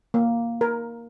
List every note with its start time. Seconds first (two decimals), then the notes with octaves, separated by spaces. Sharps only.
0.14 A#3
0.61 A#4